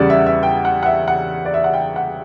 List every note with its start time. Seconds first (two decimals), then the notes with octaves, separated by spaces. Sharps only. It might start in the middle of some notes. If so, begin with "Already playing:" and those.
Already playing: E2 C#3 G3 D5 F#5
0.10 E5
0.26 E5
0.43 G5
0.65 F#5
0.83 F#5
0.86 E5
1.08 F#5
1.45 D5
1.54 E5
1.64 F#5
1.74 G5
1.96 F#5